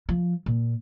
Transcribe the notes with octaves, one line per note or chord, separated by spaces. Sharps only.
F3
A#2